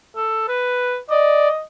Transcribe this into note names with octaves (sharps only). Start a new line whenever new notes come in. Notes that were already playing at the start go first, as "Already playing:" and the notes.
A4
B4
D5 D#5